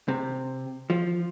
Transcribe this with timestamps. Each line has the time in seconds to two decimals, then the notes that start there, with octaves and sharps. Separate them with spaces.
0.08 C3
0.90 F3